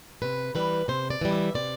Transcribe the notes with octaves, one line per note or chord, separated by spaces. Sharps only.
C3 B4
E3 G3 B4
C3 C5
D5
E3 G3
E5
C3 D5